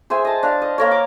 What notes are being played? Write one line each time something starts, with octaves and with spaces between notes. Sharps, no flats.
G#4 C5 E5 G#5
D#5 A5
D4 F5
D#5
A#3 A#4 C#5
D6